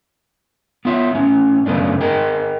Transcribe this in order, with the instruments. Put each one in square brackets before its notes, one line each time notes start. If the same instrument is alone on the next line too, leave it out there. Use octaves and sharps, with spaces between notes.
[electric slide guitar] B3 F4 E5
A2 C#4
F#2 C#3 A3 B3 D4
G#4 A#4 D#5 G5